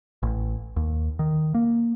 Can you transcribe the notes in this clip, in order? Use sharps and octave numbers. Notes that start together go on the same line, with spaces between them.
A1
D#2
D#3
A#3